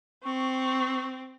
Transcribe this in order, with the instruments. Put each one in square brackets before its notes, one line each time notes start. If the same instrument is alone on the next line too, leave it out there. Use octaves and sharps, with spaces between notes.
[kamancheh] C4 [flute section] C#6